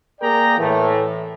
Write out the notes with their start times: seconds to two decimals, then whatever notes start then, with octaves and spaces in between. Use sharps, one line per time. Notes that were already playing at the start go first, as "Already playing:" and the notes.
0.21 A#3 G#4 A#4 D5 G5 A#5
0.58 A2 E3 A3